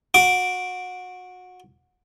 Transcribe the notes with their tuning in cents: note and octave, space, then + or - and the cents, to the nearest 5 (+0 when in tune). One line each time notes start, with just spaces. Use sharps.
F#4 -25 D6 -5